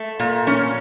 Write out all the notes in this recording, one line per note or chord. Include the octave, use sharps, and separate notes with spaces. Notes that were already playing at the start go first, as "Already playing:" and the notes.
Already playing: A3
A#2
C#4